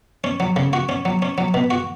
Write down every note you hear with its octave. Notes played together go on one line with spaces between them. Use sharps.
C#4
F#3
C#3
F#4
C#4
F#3
C#4
F#3
B2
F#4